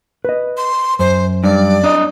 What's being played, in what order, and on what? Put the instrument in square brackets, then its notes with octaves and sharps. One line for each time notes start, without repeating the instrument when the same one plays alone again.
[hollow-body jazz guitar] B4 D#5
[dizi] C6
[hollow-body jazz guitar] F#2 [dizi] C5
[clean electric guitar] G2 [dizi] D5
[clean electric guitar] D4 D#5